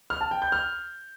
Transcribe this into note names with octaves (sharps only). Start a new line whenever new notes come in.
F6
A5
G5
G6
F6